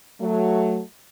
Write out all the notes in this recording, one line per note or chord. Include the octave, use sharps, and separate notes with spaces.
F#3 A3